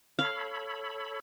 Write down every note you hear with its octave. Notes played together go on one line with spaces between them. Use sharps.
A4 C#5 F5 B5